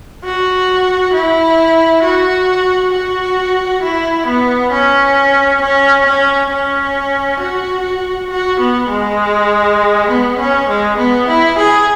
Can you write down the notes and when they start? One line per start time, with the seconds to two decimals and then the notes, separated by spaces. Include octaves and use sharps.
0.24 F#4
1.13 E4
2.03 F#4
2.93 F#4
3.83 E4
4.27 B3
4.72 C#4
5.62 C#4
6.06 C#4
6.50 C#4
7.40 F#4
8.30 F#4
8.59 B3
8.89 G#3
10.09 B3
10.39 C#4
10.69 G#3
10.98 B3
11.28 E4
11.58 G#4